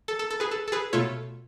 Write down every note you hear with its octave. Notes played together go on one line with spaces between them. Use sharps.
A4
A4
A4
G#4 B4
A4
A4
G#4 B4
B2 A3 F4 A4 C#5